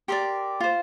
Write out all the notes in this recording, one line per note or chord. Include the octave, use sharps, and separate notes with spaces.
G4 A#4 D5 C6
F4 C5